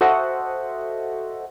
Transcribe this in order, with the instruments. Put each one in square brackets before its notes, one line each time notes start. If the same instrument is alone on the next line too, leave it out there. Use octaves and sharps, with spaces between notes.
[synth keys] F#4 A4 C5 D#5 E5 F#5